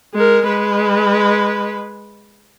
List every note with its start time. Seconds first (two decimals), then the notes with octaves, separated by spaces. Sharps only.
0.14 G#3 A#4
0.47 G#3 B4